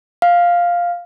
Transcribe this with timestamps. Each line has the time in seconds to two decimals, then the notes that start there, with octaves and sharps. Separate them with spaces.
0.22 F5